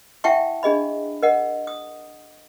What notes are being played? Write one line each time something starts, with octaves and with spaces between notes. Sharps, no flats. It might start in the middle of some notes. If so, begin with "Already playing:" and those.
E4 E5 F#5 G5 A5 C#6
D4 G#4 D#5 B5
A#4 D#5 F#5
D#6